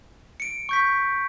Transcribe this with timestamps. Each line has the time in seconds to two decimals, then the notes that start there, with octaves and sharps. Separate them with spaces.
0.40 C#7 D7
0.69 C#6 G6 B6